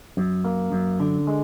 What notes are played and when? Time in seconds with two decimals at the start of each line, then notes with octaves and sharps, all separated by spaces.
0.17 F#2
0.45 A#3
0.72 F#2
1.00 D3
1.27 G#3